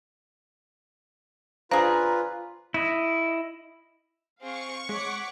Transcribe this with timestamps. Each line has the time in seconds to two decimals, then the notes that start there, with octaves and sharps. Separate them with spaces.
1.71 D4 F4 G#4 B4 C5 F5 A#5
2.74 E4 D#5
4.41 C4 G#4 F5 C#6
4.89 G#3 C#5 F#5 D6 B6